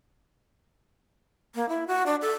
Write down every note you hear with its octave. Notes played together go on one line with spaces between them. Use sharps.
A#3
E4
F#4
D4
A4